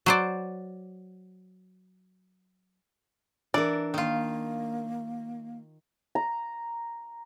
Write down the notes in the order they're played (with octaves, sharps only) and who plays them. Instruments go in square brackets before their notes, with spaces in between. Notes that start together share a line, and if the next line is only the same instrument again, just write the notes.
[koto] F#3 C5 D5
[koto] E3 [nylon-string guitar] D4 A#4 [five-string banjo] D5
[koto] D#3 F4 [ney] A#3
[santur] A#5